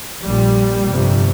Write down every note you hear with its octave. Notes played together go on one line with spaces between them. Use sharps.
A#1 A#2 G3
G1 F2 C3